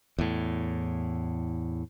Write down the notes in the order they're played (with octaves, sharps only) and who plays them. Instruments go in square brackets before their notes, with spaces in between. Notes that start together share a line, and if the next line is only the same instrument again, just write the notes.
[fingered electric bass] E2 A2